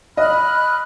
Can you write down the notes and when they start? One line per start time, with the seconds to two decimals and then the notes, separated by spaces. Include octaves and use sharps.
0.17 D#5 B5 F6 F#6